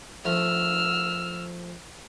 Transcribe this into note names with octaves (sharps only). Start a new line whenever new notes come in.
F3 A3 E6 F6